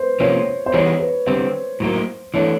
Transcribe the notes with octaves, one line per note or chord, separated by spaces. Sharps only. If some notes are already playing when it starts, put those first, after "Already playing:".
Already playing: B4 C5
C3 F3 A#3 C#4 F4 C#5
C5
E3 G3 B3 D#4 G#4 C#5
B4
D3 G3 C4 C5
A2 F#3 A#3 D#4
E3 A3 D4 C#5